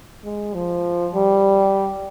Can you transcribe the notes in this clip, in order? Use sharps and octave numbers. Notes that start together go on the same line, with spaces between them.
G#3
F3
G3